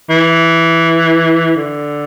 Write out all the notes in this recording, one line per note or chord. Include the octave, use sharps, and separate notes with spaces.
E3
D3